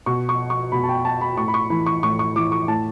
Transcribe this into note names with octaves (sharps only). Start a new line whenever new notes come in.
B2 C#6
C#6
C#6
B2 B5
A5
G5
A5
B5
A2 C#6
B5
C#6
E3 B5
C#6
A2 C#6
C#6
E3 D6
C#6
A2 A5